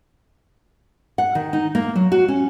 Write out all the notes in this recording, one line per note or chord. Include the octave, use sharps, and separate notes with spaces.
F#5
D#3
D#4
A#3
F#3
F#4
C#4